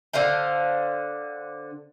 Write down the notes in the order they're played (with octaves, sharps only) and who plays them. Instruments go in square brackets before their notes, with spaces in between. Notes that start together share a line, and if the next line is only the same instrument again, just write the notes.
[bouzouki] D3 C5 F5 G5